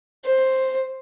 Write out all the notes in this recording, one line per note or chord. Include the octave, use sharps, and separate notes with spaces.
C5